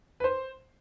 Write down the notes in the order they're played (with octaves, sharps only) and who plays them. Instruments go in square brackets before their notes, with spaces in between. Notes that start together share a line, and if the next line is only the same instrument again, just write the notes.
[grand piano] B4
C5